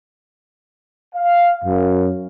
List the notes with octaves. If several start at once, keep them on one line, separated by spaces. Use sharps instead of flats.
F5
F#2